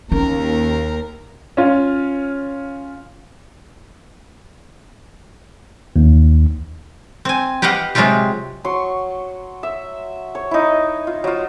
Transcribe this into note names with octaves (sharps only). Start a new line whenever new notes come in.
D#2 C#4 A#4
C#4 F4
D#2
C4 G#5
G4 B4 D#5 F5 F#5
C3 F#3 G#3 C4 F4 G4
F#3 C6 C#6
E5
C#5
D#4 E4
F4
F#3 F4